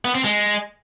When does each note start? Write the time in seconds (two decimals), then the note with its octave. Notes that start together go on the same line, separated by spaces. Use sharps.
0.05 B3
0.15 C4
0.24 G#3